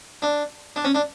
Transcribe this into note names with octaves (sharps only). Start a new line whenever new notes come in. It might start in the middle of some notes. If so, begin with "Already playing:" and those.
D4
D4
C#4
D4